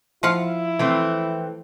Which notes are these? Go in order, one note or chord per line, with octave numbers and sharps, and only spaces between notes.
F3 E4 F5 F#5
E3 A3 C4